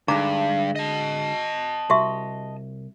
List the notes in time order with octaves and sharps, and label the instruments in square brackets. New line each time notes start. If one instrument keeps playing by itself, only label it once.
[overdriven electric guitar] G2 [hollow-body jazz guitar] D3 G#3 [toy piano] D#4 A#5 D6
[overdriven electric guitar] D#5 A5
[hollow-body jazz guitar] C2 [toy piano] F#4 G4 E5